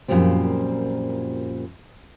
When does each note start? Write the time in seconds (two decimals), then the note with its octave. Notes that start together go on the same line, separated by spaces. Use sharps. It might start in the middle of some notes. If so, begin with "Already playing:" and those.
0.08 F#2 A#2 F3 G3 C4